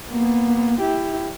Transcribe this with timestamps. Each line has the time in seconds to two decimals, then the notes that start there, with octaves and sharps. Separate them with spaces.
0.10 A#3 B3
0.80 E4 G4